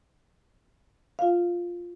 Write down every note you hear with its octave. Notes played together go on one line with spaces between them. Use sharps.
F4 F5